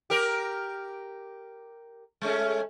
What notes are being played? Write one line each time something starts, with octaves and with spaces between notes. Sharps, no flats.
G4 A#4
G#3 A3 C#4